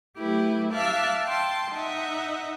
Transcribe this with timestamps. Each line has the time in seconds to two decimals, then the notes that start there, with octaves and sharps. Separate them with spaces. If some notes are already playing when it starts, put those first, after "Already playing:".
0.19 F#3 A3 E4 G4 B4
0.73 E5 F5 A5 D6 E6 F#6
1.26 G5 A5 C6
1.72 D#4 D#5 E5 F#5